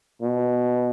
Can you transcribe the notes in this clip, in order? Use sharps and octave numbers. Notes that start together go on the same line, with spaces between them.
B2